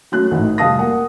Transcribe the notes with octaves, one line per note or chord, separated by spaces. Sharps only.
F#3 A3 C#4 F#6
A1 A2 D#4
F1 G3 F5 A5 D#6 A#6
A#3 F#5